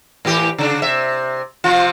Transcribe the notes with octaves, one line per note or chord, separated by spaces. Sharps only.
A2 E3 G4
C#3 D4
C3 E5
C3 F3 F4